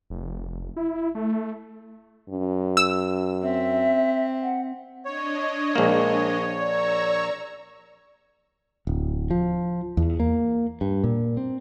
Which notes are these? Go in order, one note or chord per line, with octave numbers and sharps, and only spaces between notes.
F1
E4
A3
F#2
E6
C4 E5
F#5
D4 C#5 D#5
A#1 G#3 A#3
D5 A#5 C#6 E6
D1
F3
E2
A#3
G2
A#2
C4